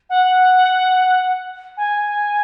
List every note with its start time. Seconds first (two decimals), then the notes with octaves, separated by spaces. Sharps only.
0.10 F#5
1.77 G#5